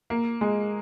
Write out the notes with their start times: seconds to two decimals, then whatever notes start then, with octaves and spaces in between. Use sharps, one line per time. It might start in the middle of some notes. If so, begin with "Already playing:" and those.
0.10 A#3
0.41 G#3